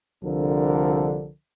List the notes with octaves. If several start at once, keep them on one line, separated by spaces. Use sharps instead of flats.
C2 D3 F3 D4 A4 A#4